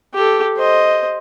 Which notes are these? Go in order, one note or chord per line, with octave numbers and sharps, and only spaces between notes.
G4 A4
C5 D#5